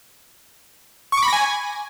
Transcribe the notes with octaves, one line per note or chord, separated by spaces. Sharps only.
C#6
D6
B5
A#6
G#5